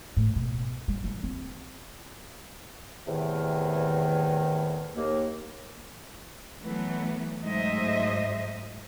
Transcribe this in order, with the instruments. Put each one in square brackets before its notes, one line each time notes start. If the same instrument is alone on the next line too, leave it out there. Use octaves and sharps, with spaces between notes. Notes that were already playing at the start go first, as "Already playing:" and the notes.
[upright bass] A2
B2
G3
E3
C4
[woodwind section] E2 A2 C3 D#3
D#2 A#3
[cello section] E3 F#3 A3 B3
G#2 F#3 A3 C5 D#5 E5